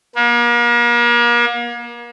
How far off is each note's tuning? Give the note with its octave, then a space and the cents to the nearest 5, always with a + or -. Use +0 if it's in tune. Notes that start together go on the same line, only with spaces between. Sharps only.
A#3 +40